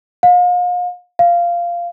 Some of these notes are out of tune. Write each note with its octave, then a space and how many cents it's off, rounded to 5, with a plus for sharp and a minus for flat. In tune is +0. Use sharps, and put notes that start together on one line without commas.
F5 +40
F5 -10